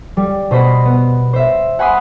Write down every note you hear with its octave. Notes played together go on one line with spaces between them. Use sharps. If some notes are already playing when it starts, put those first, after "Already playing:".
G3
B2 C5 D#5 B5 A#6 C#7
B3
C5 E5
F#5 G#5 B5 C6 D#6